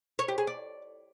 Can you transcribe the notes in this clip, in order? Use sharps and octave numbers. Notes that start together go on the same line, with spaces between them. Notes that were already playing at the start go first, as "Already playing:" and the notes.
C#5
G4
G#4
D5